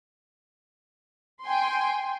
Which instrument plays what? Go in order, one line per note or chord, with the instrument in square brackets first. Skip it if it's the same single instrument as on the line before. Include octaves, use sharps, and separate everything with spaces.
[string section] G5 G#5 C6